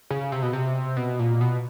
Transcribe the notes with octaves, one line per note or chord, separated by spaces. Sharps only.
C#3
C3
B2
C3
B2
A#2
B2